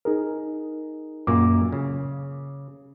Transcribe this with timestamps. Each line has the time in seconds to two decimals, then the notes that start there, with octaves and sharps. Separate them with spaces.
0.05 D#4 G#4 A#4
1.27 F#2 A#2 A#3 D6
1.72 C#3